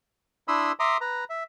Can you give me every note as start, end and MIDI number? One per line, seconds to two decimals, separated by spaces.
0.48 0.72 62
0.48 0.72 64
0.48 0.72 83
0.48 0.72 84
0.48 0.72 87
0.48 0.72 88
0.80 0.97 76
0.80 0.97 82
0.80 0.97 84
0.80 0.97 86
0.80 0.97 87
1.01 1.24 71
1.01 1.24 82
1.30 1.43 76